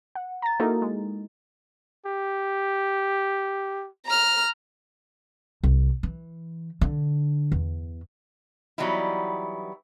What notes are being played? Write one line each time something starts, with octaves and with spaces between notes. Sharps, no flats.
F#5
A#5 A6
A#3 D#4 E4 F#4 A4 A#4
G#3
G4
A#5 F6
C2
E3
D3
E2
E3 F#3 G3 B3 D#4 E4